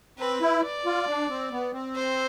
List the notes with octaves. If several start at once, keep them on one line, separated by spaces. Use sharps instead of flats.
C4 B4
E4
D5
F4
D4
C4
B3
C4
C5